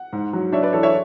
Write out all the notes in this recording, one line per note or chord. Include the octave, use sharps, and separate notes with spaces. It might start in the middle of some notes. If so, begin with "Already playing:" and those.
Already playing: F#5
G#2
F#3
D4 C#5 E5
B4 D5
E3 A4 C#5
C#5 E5